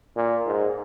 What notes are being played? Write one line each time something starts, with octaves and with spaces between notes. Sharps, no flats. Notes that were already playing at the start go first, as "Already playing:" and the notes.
A#2
G#2